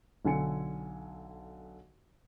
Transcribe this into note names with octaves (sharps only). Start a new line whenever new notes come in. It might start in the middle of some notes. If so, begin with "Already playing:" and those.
B1 D3 A4 G#5 C#7